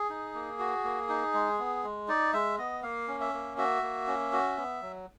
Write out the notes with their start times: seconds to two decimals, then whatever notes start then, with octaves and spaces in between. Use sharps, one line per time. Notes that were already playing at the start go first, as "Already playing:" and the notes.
Already playing: G#4
0.10 D#4
0.34 A#3
0.59 F#4
0.84 A#3
1.09 D#4
1.34 G#3
1.59 B3
1.84 G#3
2.08 D#4 D5
2.33 G#3 E5
2.58 B3 D#5
2.83 A#3 F5
3.08 C#4
3.21 E5
3.33 A#3
3.58 F#4 E5
3.82 A#3
4.07 C#4
4.33 F#4
4.57 B3
4.82 F#3